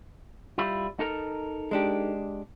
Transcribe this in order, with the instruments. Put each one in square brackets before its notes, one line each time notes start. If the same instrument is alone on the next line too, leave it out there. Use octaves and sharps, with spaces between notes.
[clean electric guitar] G3 E4 F4
D#4 A4 A#4
[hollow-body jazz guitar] G#3 D4 G4